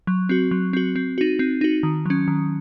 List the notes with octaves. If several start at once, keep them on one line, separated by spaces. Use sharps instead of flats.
F#3
C4 F#4
F#3
C4 F#4
C4
D#4 F#4
C4
D#4 F#4
D#3
F#3 C#4
D#3